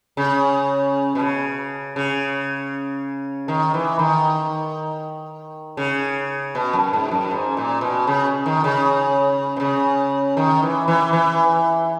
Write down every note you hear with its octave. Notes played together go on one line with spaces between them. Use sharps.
C#3
B2
C#3
C#3
D#3
E3
D#3
C#3
B2
F#2
G#2
F#2
G#2
A#2
B2
C#3
D#3
C#3
B2
C#3
D#3
E3
E3
E3